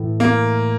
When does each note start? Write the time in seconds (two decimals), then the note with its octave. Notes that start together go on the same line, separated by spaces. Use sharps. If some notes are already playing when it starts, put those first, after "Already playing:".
Already playing: A2 E3 A3
0.20 A#3